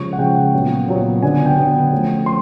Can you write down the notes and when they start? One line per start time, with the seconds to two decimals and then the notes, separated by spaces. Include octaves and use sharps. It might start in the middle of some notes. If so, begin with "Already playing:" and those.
Already playing: C#3 F3 G#3 C#4 C#6
0.13 F#5
0.18 C#3 F3 G#3 C#4 G5
0.54 A#2 F#3 B3
0.88 A#2 F#3 B3
1.23 D3 F#3 B3 D4 G#5
1.46 G5
1.57 D3 F#3 B3 D4
1.92 F3 A3 C#4
2.26 F3 C6